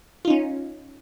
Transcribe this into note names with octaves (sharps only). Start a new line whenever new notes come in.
C#4 D#4 F4